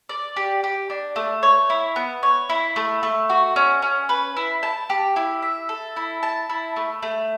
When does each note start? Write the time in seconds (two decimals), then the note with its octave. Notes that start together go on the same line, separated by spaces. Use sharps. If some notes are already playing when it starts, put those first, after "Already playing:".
0.09 D5
0.37 G4
0.64 G4
0.90 D4
1.16 A3
1.43 C#5
1.70 E4
1.96 B3
2.23 C#5
2.50 E4
2.76 A3
3.03 A3
3.30 F#4
3.56 C#4
3.82 C#4
4.09 B4
4.37 E4
4.63 A5
4.90 G4
5.16 E4
5.42 E5
5.69 A4
5.96 E4
6.23 A5
6.50 E4
6.76 A3
7.03 A3